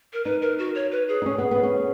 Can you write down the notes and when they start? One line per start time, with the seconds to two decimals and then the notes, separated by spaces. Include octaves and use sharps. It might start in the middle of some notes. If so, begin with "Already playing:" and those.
0.13 A#4
0.24 D#4 B4
0.42 A#4
0.59 F#4
0.75 C#5
0.92 B4
1.08 G#4
1.22 D#4
1.26 C#4
1.38 B3
1.51 B3
1.63 C#4